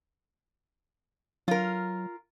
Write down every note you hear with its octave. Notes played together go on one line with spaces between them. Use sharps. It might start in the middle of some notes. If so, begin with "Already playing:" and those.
F#3 F4 A#4